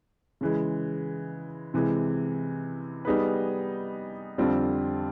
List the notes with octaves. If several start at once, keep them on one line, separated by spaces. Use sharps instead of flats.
C#3 E3 G#3
C3 E3 G#3
G3 B3 D#4 G#4 B4
F2 D3 G3 C4 F4